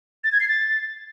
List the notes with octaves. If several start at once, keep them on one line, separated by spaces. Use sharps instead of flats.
A6
G#6
C7
A6